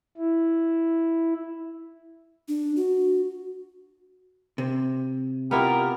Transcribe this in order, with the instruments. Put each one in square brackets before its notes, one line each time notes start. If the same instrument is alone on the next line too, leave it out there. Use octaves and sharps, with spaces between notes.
[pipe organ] E4
[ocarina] D4
F#4
[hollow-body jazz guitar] C3
[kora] B3 E4 F4 [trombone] G4 [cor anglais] A#4